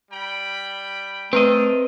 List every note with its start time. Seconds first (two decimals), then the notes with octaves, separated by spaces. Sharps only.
0.11 G3 G5 B5
1.33 A3 C4 A#4 B4 D#5